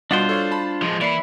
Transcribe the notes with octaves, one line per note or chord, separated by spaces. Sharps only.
B2 G3 D4 F4 F#4 C5 F#5 C7
A4 C#5 F5
A5 B5
F3 G#3
E3 A#3 E4 D5 C7